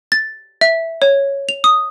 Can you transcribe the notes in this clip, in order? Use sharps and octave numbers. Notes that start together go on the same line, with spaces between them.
A6
E5
C#5
F7
D#6